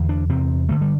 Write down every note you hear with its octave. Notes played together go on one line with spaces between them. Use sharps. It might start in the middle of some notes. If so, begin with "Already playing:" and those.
Already playing: E2 D3
D4
E2 C3 C4
G2 D3 A3
G3